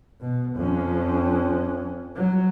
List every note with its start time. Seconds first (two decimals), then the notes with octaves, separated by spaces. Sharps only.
0.21 B2
0.56 F2 C#4
2.16 F#3